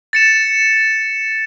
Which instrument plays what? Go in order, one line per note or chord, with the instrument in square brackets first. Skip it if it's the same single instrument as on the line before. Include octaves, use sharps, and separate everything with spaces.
[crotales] A6 C#7 E7